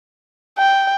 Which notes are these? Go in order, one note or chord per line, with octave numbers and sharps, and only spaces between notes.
G5